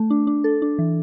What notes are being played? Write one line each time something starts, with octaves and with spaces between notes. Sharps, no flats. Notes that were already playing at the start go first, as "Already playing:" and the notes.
Already playing: A3
D4
D4
A4
D4
E3